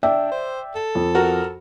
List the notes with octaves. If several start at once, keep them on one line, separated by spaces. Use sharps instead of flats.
D4 D5 E5 G5
C5
A4
F2
F#4 A#4